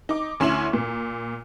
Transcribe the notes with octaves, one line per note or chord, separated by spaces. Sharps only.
D#4 D6
D2 C#4 E4 C6 E7 F#7
A#2